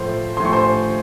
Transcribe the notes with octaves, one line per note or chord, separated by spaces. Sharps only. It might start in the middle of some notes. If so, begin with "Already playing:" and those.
Already playing: A2 F3 A3 C5 C6
A2 F3 A3 C6
C#6
C5 C6